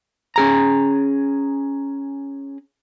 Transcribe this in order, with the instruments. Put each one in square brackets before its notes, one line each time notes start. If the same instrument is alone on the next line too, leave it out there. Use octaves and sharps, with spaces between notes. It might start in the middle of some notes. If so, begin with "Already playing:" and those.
[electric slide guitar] C#4 G#4 A#5